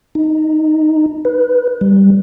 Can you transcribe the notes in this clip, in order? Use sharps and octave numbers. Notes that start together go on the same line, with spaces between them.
D#4
B4
G3